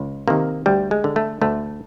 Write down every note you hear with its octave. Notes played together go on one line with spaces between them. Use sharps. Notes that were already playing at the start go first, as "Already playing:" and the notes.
Already playing: C#2
C3 D#3 A#3
D2 G3
G#3
D3
A3
D2 A3